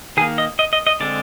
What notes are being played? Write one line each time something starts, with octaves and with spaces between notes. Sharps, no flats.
D#3 A#3 G#4
D#5
D#5
D#5
D#5
D3 G#3 C4 D5